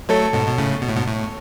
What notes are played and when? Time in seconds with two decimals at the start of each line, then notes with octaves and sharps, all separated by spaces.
0.09 F#3 A3 A4 C#5
0.33 G#2 B2
0.47 B2
0.58 A2 C#3
0.82 B2
0.89 A2
0.96 G#2 B2
1.07 A2